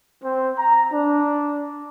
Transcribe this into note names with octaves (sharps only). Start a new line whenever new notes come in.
C4
A#5
D4